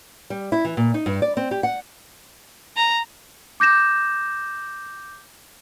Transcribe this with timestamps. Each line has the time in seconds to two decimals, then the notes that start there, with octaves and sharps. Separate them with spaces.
0.30 G3
0.52 E4
0.65 E3
0.77 A#2
0.94 D#4
1.06 G2
1.22 D5
1.37 C4
1.51 G4
1.63 F#5
2.77 A#5
3.60 D6 G6 A#6 E7